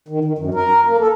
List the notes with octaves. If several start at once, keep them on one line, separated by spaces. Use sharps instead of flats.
D#3
D#3
F#2
A#4
A#3
A4